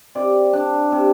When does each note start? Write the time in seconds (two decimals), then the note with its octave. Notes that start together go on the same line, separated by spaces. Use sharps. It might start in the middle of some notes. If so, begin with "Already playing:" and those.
0.15 C3 D5
0.53 D4
0.92 C3